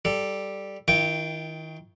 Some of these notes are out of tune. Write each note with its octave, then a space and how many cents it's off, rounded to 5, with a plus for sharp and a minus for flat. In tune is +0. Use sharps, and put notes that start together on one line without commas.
G3 +0 A4 +0
D#3 +25 F4 -35 G5 -5